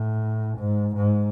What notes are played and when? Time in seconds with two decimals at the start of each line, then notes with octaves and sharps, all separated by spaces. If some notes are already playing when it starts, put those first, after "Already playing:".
Already playing: A2
0.58 G#2
0.96 G#2